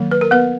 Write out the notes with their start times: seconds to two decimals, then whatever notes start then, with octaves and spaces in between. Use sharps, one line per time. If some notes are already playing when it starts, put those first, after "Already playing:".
Already playing: D#3 F#3 A#3
0.11 B4
0.21 A#4
0.31 B3 B4